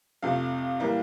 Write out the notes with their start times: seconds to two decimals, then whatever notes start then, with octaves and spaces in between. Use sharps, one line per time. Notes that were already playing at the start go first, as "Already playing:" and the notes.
0.22 F2 C3 F3 A3 F5
0.80 A2 E3 G3 A#3